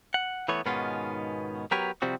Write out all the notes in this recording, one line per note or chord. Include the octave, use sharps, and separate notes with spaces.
F#5
E3 A3 B3 C#5
G#2 B2 D#3 B3 C#4 F4
F#3 B3 G4 A#4 B4 C#5
C3 F3 G3 C4 F#4